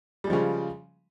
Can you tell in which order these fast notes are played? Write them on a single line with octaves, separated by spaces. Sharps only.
G3 G#3 F3 C#3